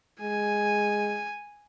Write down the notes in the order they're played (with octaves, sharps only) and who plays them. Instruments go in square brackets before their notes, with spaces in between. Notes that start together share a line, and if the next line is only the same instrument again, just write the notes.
[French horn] G#3 [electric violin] G#5